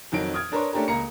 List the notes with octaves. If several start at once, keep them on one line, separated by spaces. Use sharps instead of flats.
F2 D#3 F#3 D7
D#6 F6 G#6
D4 A#4 B4 C#5 C6
A3 C#4 D4 G4 A#4
C#2 A#3 A#5 C#7